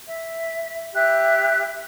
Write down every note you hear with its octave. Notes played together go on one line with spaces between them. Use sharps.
E5
G4 E5 F#6